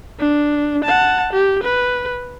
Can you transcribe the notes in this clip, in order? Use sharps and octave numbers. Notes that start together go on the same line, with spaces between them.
D4
F#5 A5
G4
B4